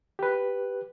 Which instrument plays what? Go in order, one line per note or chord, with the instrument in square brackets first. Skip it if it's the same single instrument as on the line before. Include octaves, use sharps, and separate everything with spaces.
[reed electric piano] G4 B4